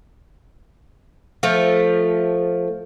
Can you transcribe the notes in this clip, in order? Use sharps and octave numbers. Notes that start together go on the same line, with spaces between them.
F3 A3